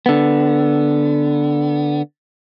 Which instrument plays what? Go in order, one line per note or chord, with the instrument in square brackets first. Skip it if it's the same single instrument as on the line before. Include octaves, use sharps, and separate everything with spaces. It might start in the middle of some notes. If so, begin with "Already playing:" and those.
[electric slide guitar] D3 B3